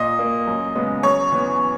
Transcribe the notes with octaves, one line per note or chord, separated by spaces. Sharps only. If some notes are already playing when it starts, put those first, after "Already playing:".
Already playing: A#2 D#5
A#3
F#2
C#3 G#3 B3
F#2 C#5
E3 B3